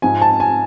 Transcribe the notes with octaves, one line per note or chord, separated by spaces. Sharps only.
G#2 F3 G#5
A5
G#5